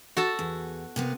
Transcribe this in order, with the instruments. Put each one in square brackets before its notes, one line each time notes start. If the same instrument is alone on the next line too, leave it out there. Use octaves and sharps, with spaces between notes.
[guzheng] F#4 A4 A5
[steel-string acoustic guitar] E2
C3 A#3 B3